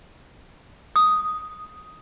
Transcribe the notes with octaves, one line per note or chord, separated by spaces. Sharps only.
D#6